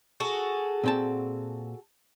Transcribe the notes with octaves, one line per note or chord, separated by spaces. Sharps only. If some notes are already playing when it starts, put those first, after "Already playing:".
F#4 G#4 A4
A#2 C4 A5